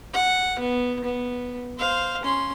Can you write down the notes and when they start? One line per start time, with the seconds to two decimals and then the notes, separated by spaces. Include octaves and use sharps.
0.14 F#5
0.59 B3
1.04 B3
1.78 C5 F5
2.23 C#4 C6